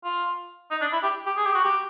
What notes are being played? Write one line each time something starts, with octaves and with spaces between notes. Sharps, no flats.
F4
D#4
D4
E4
G4
G4
G#4
G4
F#4
G4